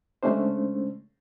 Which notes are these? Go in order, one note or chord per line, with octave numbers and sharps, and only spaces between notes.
C#3 G#3 A3 C#4 D4 C5